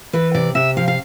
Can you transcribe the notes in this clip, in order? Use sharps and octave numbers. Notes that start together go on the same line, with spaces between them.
E3 B4
C3 D5
C3 E5
F3 F5
F5